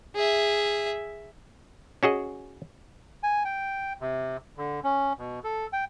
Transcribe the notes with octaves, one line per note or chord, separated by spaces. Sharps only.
G#4 E5
C#4 F#4 G#4 D#5
G#5
G5
C3
D3
C#4
B2
A4
G5